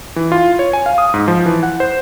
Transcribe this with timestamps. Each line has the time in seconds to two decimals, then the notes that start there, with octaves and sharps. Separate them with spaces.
0.16 E3
0.32 F4
0.59 C#5
0.73 G#5
0.86 F5
0.98 D#6
1.14 G#2
1.28 F3
1.46 E3
1.63 F#5
1.80 C5